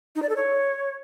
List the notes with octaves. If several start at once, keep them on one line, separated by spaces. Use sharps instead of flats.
D#4
D5
A4
C#5